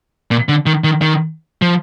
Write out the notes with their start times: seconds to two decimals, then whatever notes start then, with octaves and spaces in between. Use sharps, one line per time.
0.31 A#2
0.49 D3
0.66 D#3
0.84 D#3
1.02 D#3
1.62 F3